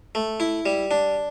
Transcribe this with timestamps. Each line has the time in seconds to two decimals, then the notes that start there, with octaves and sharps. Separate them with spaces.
0.15 A3
0.40 E4
0.66 G3
0.91 D4